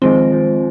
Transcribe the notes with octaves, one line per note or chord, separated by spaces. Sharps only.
D#3 F3 G#3 C4
F3